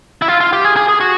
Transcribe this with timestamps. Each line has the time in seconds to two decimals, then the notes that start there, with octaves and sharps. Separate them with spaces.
0.22 E4
0.28 F4
0.41 F4
0.53 G4
0.64 G#4
0.76 G#4
0.89 G#4
1.00 F#4